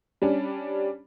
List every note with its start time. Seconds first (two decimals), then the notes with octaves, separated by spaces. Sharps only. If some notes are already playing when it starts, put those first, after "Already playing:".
0.22 G3 C#4 D4